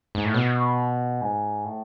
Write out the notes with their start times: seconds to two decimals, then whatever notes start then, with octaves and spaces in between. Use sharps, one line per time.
0.15 G#2
0.25 A2
0.34 B2
1.21 G#2
1.64 A2